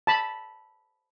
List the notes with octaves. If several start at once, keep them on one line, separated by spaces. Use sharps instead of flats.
A5 B5